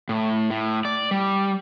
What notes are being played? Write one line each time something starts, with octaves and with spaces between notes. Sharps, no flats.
A2
A2
D5
G3